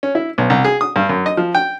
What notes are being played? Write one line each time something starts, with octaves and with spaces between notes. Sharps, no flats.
C#4
E4
B1
C2
G#4
D#6
G2
F#2
D#5
F3
G5